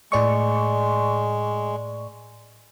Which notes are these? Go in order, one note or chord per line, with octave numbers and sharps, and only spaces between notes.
A2 G#3 D5 C#6